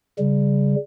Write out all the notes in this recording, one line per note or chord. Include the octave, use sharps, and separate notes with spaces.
C#3 G3